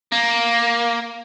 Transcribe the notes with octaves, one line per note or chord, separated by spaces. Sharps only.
A#3